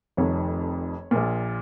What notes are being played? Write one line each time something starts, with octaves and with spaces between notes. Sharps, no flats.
F1 F2 D#3 C#5
A#1 A#2